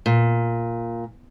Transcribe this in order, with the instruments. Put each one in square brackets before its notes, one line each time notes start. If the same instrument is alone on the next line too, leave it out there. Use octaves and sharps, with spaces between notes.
[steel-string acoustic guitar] A#2